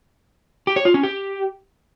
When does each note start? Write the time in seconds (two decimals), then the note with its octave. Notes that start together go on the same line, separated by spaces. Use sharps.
0.67 G4
0.76 C#5
0.85 F4
0.94 C#4
1.03 G4